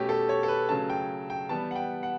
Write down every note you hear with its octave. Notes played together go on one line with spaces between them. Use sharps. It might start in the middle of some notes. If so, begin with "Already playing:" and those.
Already playing: B2 A3 C#4 G4
A4
C#5
A4
B4
C#3 F#3 A3 C#4 A5
G5
G5
E3 G3 B3 A5
F#5
G5
F#5